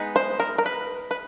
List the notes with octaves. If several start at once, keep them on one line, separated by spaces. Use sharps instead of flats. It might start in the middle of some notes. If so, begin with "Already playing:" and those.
Already playing: G#3 B3 D#4
C5
A#4
A#4
B4
B4